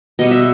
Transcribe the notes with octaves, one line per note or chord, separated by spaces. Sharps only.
B2 G3 B3 D#5
E5